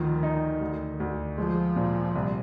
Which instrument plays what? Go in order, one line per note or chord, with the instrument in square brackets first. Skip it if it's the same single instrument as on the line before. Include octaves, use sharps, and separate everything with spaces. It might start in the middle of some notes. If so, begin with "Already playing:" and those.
Already playing: [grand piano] D2 F3 [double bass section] D#3
[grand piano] D#4
D2
D2
[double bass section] F3 [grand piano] G#3
[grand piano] A#2
C2